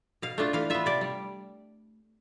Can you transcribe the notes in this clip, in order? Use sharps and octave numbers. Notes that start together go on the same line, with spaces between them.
B2 F5
A3 D4 F4
E3 F5
B3 F4 E5
C3 D5
G3